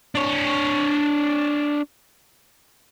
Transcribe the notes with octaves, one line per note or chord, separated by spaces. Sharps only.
D4 C#5